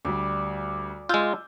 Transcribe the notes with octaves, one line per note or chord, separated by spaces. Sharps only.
D2 G3 D5
G#3 F4 E6 G6